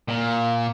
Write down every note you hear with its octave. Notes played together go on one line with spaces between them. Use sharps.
A#2